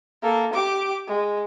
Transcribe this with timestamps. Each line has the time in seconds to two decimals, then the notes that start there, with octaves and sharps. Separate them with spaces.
0.22 A#3 A4
0.53 G4 D6
1.07 G#3